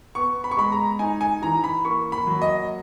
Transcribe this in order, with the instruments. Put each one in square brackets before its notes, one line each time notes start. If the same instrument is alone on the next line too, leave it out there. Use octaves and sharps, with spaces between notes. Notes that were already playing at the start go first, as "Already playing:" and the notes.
[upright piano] B3 C#6
B5
C#6
G#3 B5
A#5
D#4 G#5
G#5
E3 A#5
B5
A#3 C#6
B5
F#3
D#5